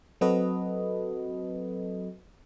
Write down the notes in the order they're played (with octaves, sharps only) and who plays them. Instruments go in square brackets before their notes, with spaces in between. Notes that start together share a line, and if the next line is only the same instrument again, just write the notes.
[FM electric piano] F#3 C4 F#4 A4 B4 D#5